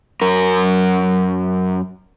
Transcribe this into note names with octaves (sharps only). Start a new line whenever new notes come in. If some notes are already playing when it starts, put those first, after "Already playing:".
F#2 A#4